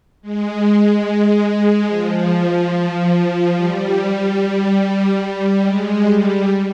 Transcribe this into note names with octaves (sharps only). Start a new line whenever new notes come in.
G#3
F3
G3
G3
G#3
G3